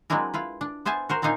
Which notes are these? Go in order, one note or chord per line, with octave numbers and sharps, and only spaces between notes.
F#3 G#3 C4 D4 E4 A#4
E4 F4 B4
D4
B3 C5 E5 G#5 A5
F#4 A#4 C5
A#2 C4 D4 D#4 F5 G#5